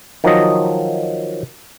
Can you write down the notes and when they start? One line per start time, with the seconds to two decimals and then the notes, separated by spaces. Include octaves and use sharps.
0.24 D#3 F3 F#3 D#5